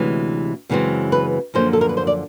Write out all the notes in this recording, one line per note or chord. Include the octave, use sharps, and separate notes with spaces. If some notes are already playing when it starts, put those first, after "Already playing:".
Already playing: D2 C3 E3 G#3 C#4
F#2 C#3 E3 G#3 C4
B4
F#2 D3 F3 A#3 C#4 C5
A4
A#4
B4
C5
D5